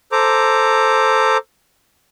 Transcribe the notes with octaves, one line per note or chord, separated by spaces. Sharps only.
A4 C5 A#5 D6